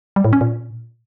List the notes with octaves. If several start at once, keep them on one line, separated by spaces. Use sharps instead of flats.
G3
A2
C#4
A#2